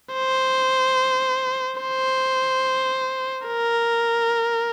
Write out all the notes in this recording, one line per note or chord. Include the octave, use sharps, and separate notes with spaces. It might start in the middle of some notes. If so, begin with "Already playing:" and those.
C5
C5
A#4